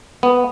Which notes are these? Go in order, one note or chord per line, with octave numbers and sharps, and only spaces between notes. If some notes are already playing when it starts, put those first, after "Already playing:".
B3